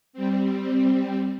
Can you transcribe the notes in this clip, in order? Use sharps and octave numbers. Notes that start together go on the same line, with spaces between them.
G3 C4